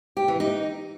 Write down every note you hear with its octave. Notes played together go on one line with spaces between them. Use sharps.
G4
E3
D#4